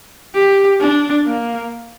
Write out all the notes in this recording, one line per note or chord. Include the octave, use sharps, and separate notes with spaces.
G4
D4
A#3